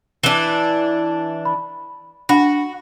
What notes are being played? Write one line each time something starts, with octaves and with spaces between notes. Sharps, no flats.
E3 D4 E7 G7
B5
D4 F#4 B5 A#6